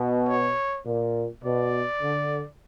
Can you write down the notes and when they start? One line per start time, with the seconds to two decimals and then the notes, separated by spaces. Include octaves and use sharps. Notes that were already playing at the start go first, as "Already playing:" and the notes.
Already playing: B2
0.28 C#5
0.86 A#2
1.44 B2 D5
2.02 D3